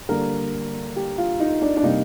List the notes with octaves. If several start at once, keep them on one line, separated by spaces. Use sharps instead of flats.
D3 G3 A#3 A#4
G4
F4
D#4
D4
D4
C3 G3 A#3 D#4